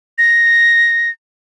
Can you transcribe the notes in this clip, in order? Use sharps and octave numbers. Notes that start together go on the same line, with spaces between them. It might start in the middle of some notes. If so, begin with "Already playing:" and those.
A#6